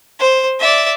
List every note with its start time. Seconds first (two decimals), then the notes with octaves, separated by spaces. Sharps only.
0.19 C5
0.60 D5 E5